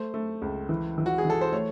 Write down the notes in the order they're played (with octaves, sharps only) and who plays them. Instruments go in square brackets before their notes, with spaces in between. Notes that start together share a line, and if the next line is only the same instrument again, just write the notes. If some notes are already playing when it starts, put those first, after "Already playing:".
Already playing: [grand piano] A3 [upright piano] C5
[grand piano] A3
C#2
E3
E3
[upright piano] F#4
G#4
[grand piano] E3
[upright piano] A4
C5
[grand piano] A3 [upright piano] C#5